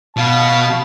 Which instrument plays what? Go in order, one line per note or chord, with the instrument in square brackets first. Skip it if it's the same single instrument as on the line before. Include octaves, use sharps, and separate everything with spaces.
[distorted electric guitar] B2 [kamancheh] F5 B5 [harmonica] A5